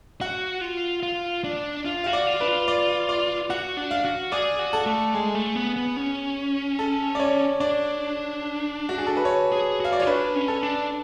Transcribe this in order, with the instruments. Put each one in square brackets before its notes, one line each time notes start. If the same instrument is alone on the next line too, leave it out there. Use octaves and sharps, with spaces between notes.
[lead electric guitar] F#4 [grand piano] F#5
[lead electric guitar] F4
F4
D4
[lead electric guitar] F4 [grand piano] F5
[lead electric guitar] F#4 [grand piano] F5
[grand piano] D5
[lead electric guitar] F4
[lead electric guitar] D4 [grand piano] B4
[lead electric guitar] F4
[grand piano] D5
D5
[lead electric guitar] F#4 [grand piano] F#5
[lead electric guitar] D4
[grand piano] F5
[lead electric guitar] F#4
[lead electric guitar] G#4 [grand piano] D5
[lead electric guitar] F#4
[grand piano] A4
[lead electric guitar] A3
[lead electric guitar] G#3 [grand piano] G#4
[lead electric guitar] A3
B3
B3
C#4
[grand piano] A4
D5
C#5
[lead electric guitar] D4 [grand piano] D5
[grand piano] F#4
G#4
A4
B4
C#5
[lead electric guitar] G#4
[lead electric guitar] F#4 [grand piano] F5
[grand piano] D5
[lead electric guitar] F4 [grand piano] C#5
[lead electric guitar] D4 [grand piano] B4
[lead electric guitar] C#4
[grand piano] A4
[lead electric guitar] D4